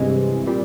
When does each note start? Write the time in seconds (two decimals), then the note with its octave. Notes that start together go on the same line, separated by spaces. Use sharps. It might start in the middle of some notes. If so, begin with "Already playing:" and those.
Already playing: G2 C3 E3 G#3
0.47 A#2 G3